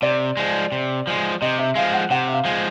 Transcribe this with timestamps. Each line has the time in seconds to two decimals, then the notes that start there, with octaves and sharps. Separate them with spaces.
0.02 C3 D5
0.37 F3 G#3
0.72 C3
1.07 F3 G#3
1.41 C3 D#5
1.59 E5
1.75 F3 G#3 F5
1.93 F#5
2.10 C3 F#5
2.28 E5
2.34 F5
2.45 F3 G#3